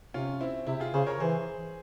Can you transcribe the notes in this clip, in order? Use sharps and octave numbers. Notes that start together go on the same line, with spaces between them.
C3 C#4 F4
C4 E4
C3 E4 G4
F4 G#4
C#3 G#4 C5
A#4 C#5
E3 G#4 C5